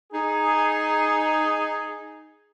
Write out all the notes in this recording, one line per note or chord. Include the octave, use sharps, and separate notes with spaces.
D#4 G#4